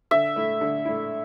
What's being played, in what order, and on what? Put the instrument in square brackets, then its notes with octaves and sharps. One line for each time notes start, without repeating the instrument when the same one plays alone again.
[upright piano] D3 [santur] E5
[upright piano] A3 E4
D3
A3 E4